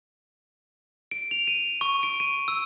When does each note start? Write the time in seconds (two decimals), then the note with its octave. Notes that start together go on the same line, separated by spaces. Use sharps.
1.11 D7
1.31 F7
1.47 D#7
1.81 C#6
2.03 D7
2.20 D#7
2.48 E6